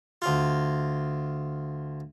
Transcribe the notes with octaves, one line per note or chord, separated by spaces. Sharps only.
D2 F4